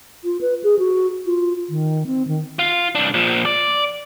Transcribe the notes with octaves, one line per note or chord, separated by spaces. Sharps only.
F4
B4
G#4
F#4
F4
D#3
C4
D#3
F4
C2 D4
A#2 F3
D5